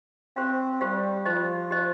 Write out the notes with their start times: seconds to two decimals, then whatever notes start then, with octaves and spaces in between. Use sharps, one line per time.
0.36 C4 G4 C5 F5
0.81 G3 G4 C5 F5
1.25 F3 G4 C5 D#5
1.71 G4 C5 D#5